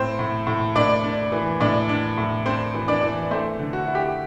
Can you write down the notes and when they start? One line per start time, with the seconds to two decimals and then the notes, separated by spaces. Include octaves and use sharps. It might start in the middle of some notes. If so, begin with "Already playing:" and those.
Already playing: A2 C4 C5
0.19 A2
0.47 A2
0.75 A2 D4 D5
1.04 D4
1.32 E3
1.60 A2 D4 D5
1.89 D4
2.18 A2
2.46 C4 D4 C5
2.74 E3
2.88 D4 D5
3.03 E3
3.31 A3 C4 C5
3.59 D3
3.73 F#4
3.87 E4
3.95 G4